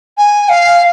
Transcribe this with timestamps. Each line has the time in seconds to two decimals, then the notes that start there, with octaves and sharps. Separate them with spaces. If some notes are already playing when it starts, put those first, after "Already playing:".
0.18 G#5
0.49 F5